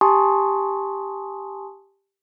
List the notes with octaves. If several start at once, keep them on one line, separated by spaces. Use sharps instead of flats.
G4 G#5 A5 C6 C#6 D#6